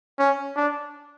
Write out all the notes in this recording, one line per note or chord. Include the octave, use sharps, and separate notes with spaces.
C#4
D4